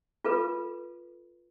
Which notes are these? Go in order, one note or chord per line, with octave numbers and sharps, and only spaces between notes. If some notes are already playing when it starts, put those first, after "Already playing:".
F4 A4 B4